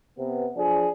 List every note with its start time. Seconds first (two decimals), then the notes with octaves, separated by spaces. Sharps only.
0.18 C3 B3
0.57 F3 D4 G#4